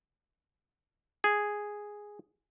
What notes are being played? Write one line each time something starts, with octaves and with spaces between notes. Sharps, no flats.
G#4